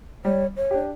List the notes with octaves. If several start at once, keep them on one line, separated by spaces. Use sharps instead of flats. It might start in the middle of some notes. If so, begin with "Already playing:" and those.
G3 C#5
C#5
D4 G4